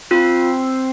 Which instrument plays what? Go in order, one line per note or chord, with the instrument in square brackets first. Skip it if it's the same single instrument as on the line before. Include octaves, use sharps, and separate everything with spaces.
[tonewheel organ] C4 [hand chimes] F4